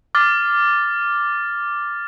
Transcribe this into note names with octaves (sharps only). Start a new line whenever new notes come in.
D6 F6 A6